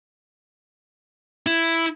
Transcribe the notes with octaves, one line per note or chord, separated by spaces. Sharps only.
E4